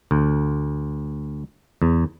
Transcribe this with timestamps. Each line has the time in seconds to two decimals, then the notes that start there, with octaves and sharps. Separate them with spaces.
0.11 D2
1.82 E2